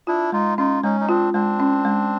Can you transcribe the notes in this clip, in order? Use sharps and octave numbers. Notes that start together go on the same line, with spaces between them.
D4 E4 F4
G#3 D#4 F4
C#4 D#4 F4
G#3 C#4 D#4
D#4
C4 D4 F4
G#3 C4 D4
C#4
G#3